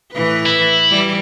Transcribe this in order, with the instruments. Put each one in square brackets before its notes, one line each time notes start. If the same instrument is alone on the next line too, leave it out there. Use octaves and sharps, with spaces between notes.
[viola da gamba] A2 E3 B4
[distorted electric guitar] E4
[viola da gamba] E3 G3